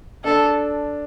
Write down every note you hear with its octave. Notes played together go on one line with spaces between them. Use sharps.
D4 A4